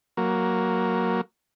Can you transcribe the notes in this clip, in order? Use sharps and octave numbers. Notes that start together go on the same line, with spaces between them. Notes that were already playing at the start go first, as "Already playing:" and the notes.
F#3 A#3